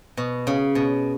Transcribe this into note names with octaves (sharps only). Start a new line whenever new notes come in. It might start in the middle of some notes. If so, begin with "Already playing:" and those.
B2
C#3
B2